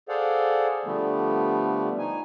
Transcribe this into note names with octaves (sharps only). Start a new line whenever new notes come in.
G#4 A4 C5 D5 F5 F#5
D3 F3 G3 A3 B3
D#4 G#5